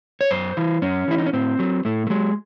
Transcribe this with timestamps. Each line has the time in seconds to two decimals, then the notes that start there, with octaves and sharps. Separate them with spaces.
0.21 C#5
0.31 F#2 C5
0.57 E3
0.82 F#2 C#4
1.08 E3 E4
1.18 D#4
1.26 C#4
1.33 A2 C4
1.59 F#3
1.85 A2 A3
2.07 A3
2.10 F#3 G#3